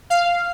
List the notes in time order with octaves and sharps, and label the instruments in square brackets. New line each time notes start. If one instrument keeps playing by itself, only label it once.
[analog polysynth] F5